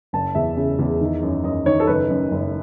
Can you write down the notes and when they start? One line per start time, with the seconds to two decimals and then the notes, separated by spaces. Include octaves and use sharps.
0.13 F#1 A5
0.35 E2 E5
0.57 C#3
0.79 E2
1.01 D#3
1.23 F#2
1.44 F#2 D#5
1.66 D#3 C#5
1.80 A4
1.87 F#1 B4
2.10 F#2
2.31 F#1